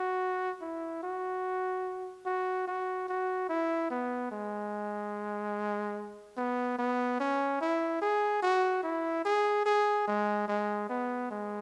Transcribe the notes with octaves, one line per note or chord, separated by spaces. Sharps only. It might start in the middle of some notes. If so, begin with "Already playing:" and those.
Already playing: F#4
E4
F#4
F#4
F#4
F#4
E4
B3
G#3
B3
B3
C#4
E4
G#4
F#4
E4
G#4
G#4
G#3
G#3
B3
G#3